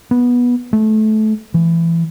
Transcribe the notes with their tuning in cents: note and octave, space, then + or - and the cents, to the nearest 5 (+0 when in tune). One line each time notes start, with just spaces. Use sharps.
B3 -15
A3 -25
E3 +20